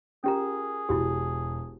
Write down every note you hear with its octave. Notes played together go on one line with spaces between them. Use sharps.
C#4 F4 G4 G#4 A#4 A#5
E1 E4 F#4 G4